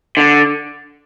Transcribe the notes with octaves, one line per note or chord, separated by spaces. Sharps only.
D3